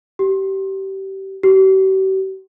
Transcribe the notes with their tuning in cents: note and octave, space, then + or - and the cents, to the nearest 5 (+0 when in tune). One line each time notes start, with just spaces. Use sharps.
G4 -25
G4 -45